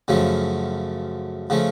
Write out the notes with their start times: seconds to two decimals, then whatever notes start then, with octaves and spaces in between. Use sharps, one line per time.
0.08 F#2 C#3 F3 A3
1.50 C#3 F3 A3